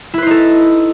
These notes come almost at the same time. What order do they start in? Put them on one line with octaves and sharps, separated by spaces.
E4 B4 C5 D#4 A4